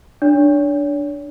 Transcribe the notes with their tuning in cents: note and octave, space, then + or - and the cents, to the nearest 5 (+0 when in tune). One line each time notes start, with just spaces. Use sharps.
D4 +0 C#5 +40